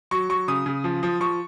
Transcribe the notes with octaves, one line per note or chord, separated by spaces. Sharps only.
F#3 C#6
F#3 C#6
C#3 D#6
C#3
F3
F3
F3 C#6